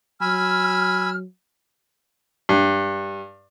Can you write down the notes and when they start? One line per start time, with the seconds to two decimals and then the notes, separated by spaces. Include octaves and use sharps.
0.21 F#3 G#5 B5 E6 F6
2.49 G2